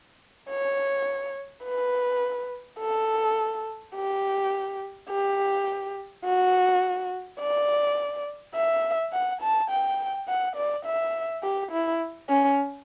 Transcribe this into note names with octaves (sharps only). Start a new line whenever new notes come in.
C#5
B4
A4
G4
G4
F#4
D5
E5
F#5
A5
G5
F#5
D5
E5
G4
E4
C#4